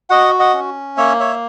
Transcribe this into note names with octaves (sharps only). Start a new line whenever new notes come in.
F#4 D#5 F#5
D#5 F#5
C#4
A#3 C#5 E5
C#5 E5